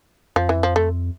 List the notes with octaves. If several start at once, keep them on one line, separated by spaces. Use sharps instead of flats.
F2 F3
E3
F3
A3